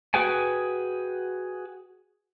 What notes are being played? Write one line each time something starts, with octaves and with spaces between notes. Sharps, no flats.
F#4 G#4 B4 G5 G#5